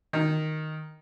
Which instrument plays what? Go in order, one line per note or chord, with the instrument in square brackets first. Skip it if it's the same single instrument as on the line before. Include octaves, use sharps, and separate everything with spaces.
[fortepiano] D#3